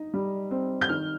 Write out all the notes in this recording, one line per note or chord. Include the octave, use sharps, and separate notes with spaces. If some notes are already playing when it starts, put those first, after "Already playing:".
Already playing: D#4
G3
C4
G6
D#3 F6